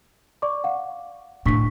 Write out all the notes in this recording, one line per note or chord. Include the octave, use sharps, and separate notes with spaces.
D5 C#6 D6
F5 F#5
A2 D3 D4 C#6 B6